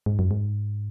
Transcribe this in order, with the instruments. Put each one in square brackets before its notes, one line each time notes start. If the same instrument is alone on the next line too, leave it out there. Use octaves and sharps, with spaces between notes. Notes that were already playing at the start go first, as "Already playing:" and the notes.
[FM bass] G#2
F#2
G#2